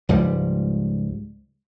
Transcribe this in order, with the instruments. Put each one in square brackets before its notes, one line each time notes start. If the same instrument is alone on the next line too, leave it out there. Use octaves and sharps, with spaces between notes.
[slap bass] C#2 G#2 F3 G3